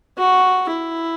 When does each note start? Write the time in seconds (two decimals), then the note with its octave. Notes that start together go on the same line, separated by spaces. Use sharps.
0.18 F#4
0.70 E4